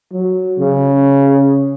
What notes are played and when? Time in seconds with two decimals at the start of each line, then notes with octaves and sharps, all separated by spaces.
0.12 F#3
0.58 C#3